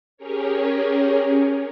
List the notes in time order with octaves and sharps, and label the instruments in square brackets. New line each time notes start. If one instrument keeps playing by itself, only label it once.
[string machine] C#4 G4 G#4 A#4 C#5